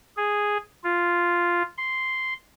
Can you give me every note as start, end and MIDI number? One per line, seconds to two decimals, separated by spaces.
0.17 0.57 68
0.84 1.63 65
1.78 2.33 84